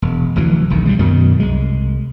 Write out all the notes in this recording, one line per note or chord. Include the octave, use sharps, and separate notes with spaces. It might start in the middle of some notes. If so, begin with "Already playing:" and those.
E1
F1 D2 E3 F#3
E1 B1 D#3
G2 G3 G#3
F#2 B2 D#3 F#3
C2 G#3